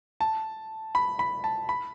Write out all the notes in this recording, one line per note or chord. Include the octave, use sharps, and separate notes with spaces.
A5
B5
B5
A5
B5